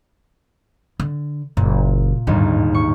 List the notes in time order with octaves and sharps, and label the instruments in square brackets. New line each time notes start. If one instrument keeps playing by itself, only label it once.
[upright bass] D3
[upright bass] F#1 [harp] A#2
[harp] G1 D#2 G#2 [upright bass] G3
[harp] C#6